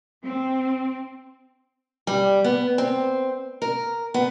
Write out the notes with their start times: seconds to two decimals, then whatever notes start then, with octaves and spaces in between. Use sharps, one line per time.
0.23 C4
2.07 G3
2.44 B3
2.78 C4
3.62 A#4
4.14 B3